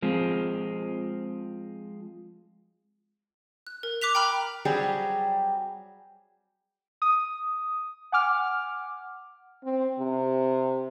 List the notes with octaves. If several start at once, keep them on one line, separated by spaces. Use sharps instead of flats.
F3 G#3 C4
F#6
A#4
D6 F#6 B6 F7
G5 A#5 B5 F6
F#3 G3 C4 G4 G#4 D5
D#6
F#5 G#5 D6 F6
C4
C3